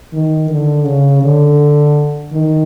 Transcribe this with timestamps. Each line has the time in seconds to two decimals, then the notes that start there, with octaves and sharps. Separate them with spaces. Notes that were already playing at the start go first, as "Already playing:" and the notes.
0.13 D#3
0.50 D3
0.85 C#3
1.23 D3
2.32 D#3